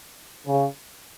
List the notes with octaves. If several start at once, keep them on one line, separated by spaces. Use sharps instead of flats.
C#3